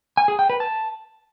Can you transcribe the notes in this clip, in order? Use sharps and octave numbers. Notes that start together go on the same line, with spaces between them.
G#5
G#4
G5
B4
A5